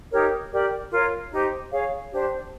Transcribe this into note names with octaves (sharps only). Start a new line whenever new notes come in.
D#4 G4 A#4 C#5
G4 A#4 D5
F4 A#4 C#5
D#4 G4 C5
G#4 C#5 F5
D4 G4 C5